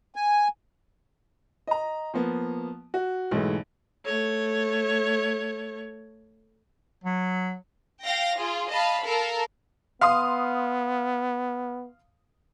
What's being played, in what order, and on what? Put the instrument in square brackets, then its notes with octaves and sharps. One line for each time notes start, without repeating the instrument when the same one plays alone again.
[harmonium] G#5
[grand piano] D#5 A#5
F3 A#3 B3
F#4
B1 G#2 E3 G#3 A3
[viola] A3 C#5
[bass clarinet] F#3
[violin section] F5 G5 A#6
F4 G#4
D#5 F5 A5 B5
A4 A#4 F5
[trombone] B3 [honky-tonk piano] F5 C6 D#6